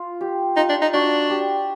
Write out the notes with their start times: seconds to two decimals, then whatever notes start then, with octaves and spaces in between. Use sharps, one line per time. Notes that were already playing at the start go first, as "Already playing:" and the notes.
Already playing: F4
0.21 G4
0.57 D#4 F4
0.69 D4
0.82 D#4
0.93 D4 F#4
1.30 G4